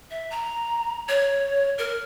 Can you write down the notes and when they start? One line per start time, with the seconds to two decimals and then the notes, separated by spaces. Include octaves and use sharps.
0.11 E5
0.31 A#5
1.08 C#5
1.78 A#4